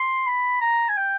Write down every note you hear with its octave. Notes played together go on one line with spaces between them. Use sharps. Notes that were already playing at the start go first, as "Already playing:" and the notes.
Already playing: C6
B5
A#5
G#5
G5